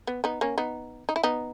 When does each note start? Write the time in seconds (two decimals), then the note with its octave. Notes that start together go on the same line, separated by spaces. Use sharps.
0.07 B3
0.24 B3 D#4
0.41 A#3 C#4
0.58 B3 D#4
1.09 D#4
1.16 E4
1.23 B3 D#4